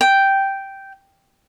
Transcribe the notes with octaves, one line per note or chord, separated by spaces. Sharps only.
G5